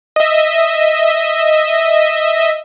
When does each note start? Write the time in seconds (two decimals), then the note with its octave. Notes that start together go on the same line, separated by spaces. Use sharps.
0.16 D#5 E5